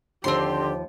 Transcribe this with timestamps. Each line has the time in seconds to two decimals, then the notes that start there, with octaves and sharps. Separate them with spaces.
0.24 D#2 D3 F3 C4 G4 A5 C6